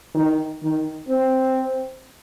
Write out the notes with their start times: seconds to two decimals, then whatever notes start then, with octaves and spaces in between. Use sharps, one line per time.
0.15 D#3
0.62 D#3
1.09 C4